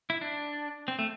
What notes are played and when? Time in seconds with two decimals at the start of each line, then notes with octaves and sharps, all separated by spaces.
0.10 E4
0.21 D4
0.88 C4
0.99 A3